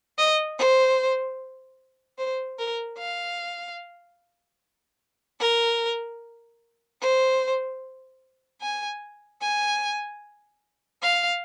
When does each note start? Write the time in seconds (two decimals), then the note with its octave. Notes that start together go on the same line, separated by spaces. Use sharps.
0.18 D#5
0.58 C5
2.18 C5
2.59 A#4
2.98 F5
5.40 A#4
7.01 C5
8.61 G#5
9.41 G#5
11.02 F5